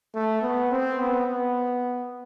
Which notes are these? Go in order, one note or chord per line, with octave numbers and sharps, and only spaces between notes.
A3
B3
C4
B3
B3